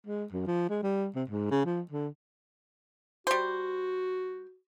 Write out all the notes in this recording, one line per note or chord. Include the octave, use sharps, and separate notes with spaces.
G#3
F#2
F3
G#3
G3
C3
G#2
C#3
F3
D3
G3 F#4 C5